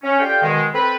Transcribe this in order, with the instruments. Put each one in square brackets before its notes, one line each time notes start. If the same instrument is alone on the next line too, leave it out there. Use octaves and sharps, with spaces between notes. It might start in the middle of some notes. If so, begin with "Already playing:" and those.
[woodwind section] C#4
F4 G4 A4 D5 F5 G5
B2 D#3 G#3
C4 A4 B4